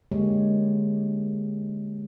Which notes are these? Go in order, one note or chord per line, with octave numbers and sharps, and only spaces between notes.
D3 G#3 A#3 G4 G#4 C#5